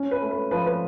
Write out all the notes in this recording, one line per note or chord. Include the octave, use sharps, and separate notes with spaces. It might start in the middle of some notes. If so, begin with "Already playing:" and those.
Already playing: C#4
B4
A3
B4
F3 B4
B4